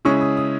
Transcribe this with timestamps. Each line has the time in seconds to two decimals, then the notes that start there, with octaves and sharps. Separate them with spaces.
0.05 C#3 G#3 C#4 E4 C#6
0.21 D#6
0.37 D#6